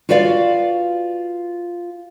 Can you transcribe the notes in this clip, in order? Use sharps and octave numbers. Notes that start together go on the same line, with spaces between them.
F4 F#4 B4 D5 F5